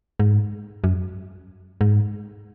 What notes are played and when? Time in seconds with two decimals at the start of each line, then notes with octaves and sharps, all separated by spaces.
0.20 G#2
0.84 F#2
1.81 G#2